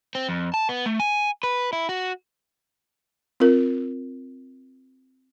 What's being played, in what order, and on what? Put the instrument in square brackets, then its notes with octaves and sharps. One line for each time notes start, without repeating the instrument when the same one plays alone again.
[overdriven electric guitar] C4
F2
A5
B3
A3
G#5
B4
E4
F#4
[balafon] C4 F4 A#4